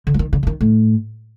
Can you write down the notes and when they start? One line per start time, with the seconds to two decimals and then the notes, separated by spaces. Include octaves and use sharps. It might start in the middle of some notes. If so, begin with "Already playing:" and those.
0.07 D3
0.14 F#3
0.19 D#3
0.33 D3
0.43 D3
0.47 D#3
0.61 A2